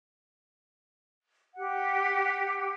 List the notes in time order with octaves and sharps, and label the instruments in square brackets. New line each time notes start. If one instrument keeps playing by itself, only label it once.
[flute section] G4 F#5